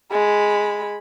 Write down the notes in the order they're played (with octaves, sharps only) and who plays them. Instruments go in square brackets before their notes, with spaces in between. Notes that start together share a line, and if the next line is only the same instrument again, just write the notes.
[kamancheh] G#3 B5